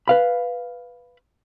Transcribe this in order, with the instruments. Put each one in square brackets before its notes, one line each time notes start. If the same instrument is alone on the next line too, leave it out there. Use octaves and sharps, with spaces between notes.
[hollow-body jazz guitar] B4 F5 B5